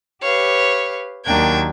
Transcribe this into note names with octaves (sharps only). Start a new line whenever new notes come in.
G4 B4 C#5 F5
D#2 F#3 A#3 D4 G5 G#6